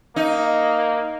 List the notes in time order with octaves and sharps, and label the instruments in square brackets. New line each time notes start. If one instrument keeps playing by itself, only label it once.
[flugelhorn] A#3 [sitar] D#4